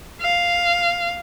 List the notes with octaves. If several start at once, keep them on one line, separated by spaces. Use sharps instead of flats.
F5